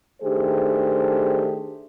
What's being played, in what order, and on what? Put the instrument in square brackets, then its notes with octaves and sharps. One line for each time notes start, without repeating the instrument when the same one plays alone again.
[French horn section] D#3 A3 D4 G4 G#4 C5